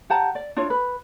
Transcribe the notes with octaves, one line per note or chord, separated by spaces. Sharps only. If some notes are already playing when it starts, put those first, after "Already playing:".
G4 F#5 A5 A#5
D5
D4 E4 F4 C#5
B4